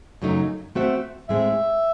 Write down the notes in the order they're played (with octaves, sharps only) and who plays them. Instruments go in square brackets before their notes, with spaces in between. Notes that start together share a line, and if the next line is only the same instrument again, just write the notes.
[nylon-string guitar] F#2 C#3 F#3 A3 D#4
A3 C4 F#4 C5 E5
[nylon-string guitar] A2 G#3 C4 [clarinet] E5